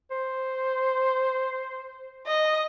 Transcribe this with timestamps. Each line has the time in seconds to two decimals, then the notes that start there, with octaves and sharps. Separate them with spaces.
0.11 C5
2.27 D#5